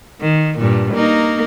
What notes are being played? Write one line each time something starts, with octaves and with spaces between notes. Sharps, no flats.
D#3
G2 A#2
A#3 D#4